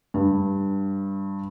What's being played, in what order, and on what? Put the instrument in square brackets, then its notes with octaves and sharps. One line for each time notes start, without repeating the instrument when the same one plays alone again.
[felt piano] G2